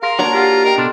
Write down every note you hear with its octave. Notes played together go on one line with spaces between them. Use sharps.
G#4 A#4 F5 C6 A#6
A#3 D4 F#4 C#5 A5 A#5
F4 G4 F#5
A#4 D#5 G5
B2 D4 A4 C6 F6